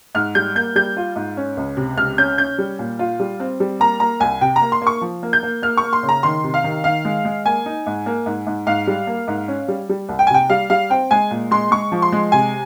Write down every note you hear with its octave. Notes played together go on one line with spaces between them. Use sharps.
G#2 F6
G3 G6
A#3 G6
G3 G6
F4
G#2
C#4
C#2
C3
C#2 F6
C#4 G6
C#4 G6
G3
A#2
F4
G3
C4
G3
A#3 A#5
A#3 A#5
C2 G#5
C3 G5
A#5
A#3
C6
A#3
C#6
F3
A#3
G6
A#3
A#3 F6
C#6
A#3
C6
C#3
A#5
D#3 C6
C3
F5
D#3
D#3 F5
G#3
G#3
A#3 G#5
D#4
G#2
A#3
G#2
G#2
G#2 F5
G3
A#3
G#2
C#4
G3
G3
C2
G5
G#5
C3 G5
G3 F5
G3 F5
C4 G5
G#3 G#5
A#2
G#3 C6
G#3 C#6
F3
C6
G#3
C3 G#5